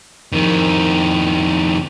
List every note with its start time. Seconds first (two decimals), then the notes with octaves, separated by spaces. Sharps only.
0.32 F2 D#3